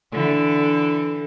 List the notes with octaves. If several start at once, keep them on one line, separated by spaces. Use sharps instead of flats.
D3 E3 A4